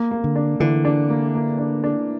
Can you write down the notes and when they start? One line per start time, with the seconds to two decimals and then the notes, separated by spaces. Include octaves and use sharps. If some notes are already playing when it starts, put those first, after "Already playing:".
Already playing: A#3
0.11 A#3
0.24 D3
0.36 D4
0.60 D3 E3
0.85 D4
1.10 A#3
1.35 A#3
1.58 D4
1.84 D4